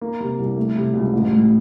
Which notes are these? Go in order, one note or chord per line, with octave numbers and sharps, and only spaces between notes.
A#3
C3
C2
A3
C3
C#2
A1
A2